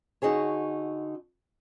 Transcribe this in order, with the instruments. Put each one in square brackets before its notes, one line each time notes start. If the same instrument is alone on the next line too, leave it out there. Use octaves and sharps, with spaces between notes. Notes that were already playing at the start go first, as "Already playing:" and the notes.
[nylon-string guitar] D3 D#4 F#4 G#4 C#5